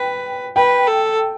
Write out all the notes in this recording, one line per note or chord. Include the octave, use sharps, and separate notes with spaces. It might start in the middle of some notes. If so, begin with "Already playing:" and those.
Already playing: B4 G5
B4 G5
A4